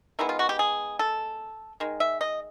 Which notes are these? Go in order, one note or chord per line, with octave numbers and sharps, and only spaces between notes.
D#3 G#3 B3 E4
F4
F#4
G4
G#4
A4
D#3 G#3
E5
D#5